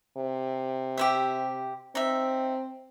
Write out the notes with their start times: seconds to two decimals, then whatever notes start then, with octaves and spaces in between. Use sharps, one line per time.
0.17 C3
0.98 G4 C5 E5
1.95 C4 D#4 E5